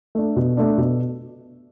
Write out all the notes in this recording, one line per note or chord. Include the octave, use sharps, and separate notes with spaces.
A3 D4
B2
A3 D4
B2